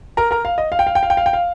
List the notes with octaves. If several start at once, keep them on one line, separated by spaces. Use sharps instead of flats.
A#4 A#5
A#4 A#5
F5
D#5
F5
G5
F5
G5
F5
G5
F5
G5
F5